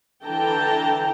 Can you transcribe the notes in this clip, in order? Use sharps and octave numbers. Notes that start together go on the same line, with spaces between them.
D3 E3 G5 A5 A#5